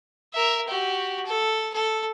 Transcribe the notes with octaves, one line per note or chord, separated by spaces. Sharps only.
A#4 E5
F#4 G4
A4
A4